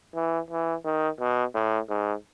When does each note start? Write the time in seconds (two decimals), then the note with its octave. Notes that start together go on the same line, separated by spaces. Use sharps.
0.15 E3
0.50 E3
0.84 D#3
1.20 B2
1.54 A2
1.89 G#2